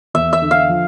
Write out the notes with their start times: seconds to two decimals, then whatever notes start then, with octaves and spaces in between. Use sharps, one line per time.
0.14 E2 E5
0.33 E5
0.42 D3
0.51 F5
0.69 F3